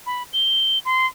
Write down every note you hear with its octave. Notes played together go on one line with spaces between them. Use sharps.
B5
G7
C6